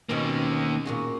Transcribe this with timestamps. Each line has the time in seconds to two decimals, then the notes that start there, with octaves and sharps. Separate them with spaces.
0.09 B2 D#3 A#3 C4 C#4
0.85 A#2 F#4 G#4